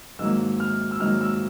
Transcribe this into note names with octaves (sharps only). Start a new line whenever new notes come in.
G#2 D#3 F#3 A#3 E6
F6
E6
G#2 D#3 F#3 A#3 F6
E6